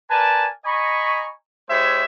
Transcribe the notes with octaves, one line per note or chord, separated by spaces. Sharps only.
A#4 B4 D5 G#5 A5
D#5 G#5 A#5 B5 C#6
G#3 E4 G4 C5 C#5 E5